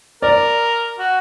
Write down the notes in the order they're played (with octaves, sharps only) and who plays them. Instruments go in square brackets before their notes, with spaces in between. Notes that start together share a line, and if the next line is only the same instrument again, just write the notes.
[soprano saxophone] A#4 [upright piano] D5
[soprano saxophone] F#4